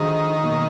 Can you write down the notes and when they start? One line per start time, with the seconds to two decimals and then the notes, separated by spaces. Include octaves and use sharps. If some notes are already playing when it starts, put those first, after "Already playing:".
Already playing: D3 D#3 F3 G#3 D#4 F#4
0.43 B2 F#3 A#3